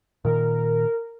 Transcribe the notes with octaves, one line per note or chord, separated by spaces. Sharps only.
A#2 D#3 A#4